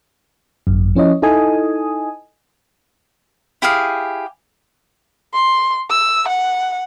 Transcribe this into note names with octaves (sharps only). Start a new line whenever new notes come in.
G#1 F#2
F3 C#4 E4 C#5 D#5
D#4 E4 A4 D#5 G#5 D#6
E4 G4 G#4 F5
C6
E6
F#5